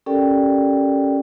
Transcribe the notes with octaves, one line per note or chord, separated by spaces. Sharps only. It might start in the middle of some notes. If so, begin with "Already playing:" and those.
C#4 G4 A4 A#4 D5 G5